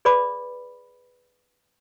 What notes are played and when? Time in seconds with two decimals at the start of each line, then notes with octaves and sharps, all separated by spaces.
0.05 G#4 B4 D5 B5 D6